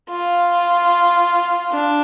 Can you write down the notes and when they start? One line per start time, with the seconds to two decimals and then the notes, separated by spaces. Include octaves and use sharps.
0.10 F4
1.71 D4